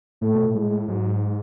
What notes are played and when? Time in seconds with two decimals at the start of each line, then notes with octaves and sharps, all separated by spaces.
0.22 A2 A3
0.34 B2
0.47 A2
0.55 G#3
0.88 G#2 F#3